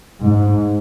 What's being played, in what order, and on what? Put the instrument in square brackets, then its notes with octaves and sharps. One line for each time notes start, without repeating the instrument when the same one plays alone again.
[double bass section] G#2